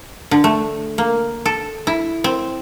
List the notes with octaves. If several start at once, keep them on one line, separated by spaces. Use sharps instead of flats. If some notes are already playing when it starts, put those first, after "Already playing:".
D3
A3
A#3
A4
E4
C4